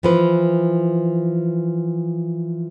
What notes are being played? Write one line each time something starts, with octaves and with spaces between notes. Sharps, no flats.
E3 F3 B4